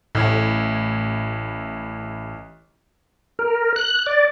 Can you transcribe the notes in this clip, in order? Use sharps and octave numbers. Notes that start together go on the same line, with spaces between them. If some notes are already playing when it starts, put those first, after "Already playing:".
A1 A2 E4 G#6
A#4
F#6
D5